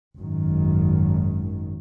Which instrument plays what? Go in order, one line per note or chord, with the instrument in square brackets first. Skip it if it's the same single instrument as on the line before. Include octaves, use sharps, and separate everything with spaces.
[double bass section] G#1 F#2 D#3